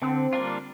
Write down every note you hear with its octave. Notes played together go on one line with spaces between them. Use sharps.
D3 C4
G3 A#3 D4 F4